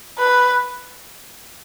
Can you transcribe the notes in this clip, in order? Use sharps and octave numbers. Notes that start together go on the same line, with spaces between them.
B4